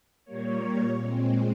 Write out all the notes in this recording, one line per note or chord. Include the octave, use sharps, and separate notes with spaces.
A#2 G3 A#3 C#5
C#5
A#2 G#3 C4